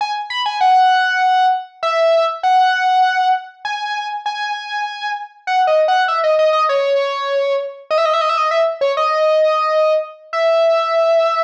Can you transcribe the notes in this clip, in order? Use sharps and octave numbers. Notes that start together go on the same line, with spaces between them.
G#5
B5
G#5
F#5
E5
F#5
G#5
G#5
F#5
D#5
F#5
E5
D#5
D#5
D#5
C#5
D#5
E5
D#5
E5
D#5
E5
D#5
E5
C#5
D#5
E5